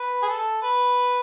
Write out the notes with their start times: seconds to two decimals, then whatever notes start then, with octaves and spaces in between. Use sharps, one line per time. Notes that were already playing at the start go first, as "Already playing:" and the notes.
Already playing: B4
0.23 G#4
0.28 A4
0.62 B4